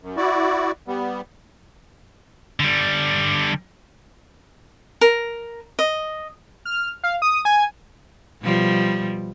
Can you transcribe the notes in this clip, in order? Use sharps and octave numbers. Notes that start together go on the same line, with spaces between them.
F#2
E4 F#4 D5
G3 B3
D3 G3
A#4
D#5
F6
F5
D#6
G#5
B2 F3 G3